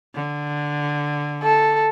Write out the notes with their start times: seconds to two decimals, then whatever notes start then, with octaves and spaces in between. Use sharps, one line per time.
0.15 D3
1.43 A4